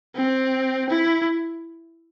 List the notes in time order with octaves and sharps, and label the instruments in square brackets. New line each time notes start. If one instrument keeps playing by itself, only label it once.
[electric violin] C4
E4